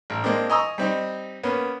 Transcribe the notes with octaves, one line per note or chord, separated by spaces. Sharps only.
A1
G#3 A#3 C4 D4
D#5 G#5 A#5 C#6 D#6 E6
G3 C4 D#4
A#3 B3 C#4